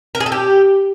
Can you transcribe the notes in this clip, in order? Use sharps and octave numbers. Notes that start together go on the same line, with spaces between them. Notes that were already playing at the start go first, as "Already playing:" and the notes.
A#4
G#4
A4
G4